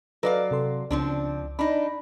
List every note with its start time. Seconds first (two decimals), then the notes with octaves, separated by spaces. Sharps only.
0.23 F#3 A4 B4 D5 D#5 F5
0.51 C3 A4 C6
0.91 C#2 C#3 F3 C4 D4
1.59 D4 D#4 B5